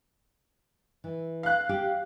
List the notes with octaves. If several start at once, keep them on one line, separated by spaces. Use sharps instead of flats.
E3
F5 F#6
G4